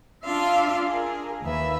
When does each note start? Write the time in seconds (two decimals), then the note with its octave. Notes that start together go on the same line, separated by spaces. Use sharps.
0.25 D4 F4 E5 F5 C6
0.87 G#4 A#4
1.43 D#2 B4 E5